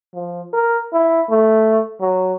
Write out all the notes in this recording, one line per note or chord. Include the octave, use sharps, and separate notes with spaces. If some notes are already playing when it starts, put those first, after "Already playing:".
F3
A#4
E4
A3
F#3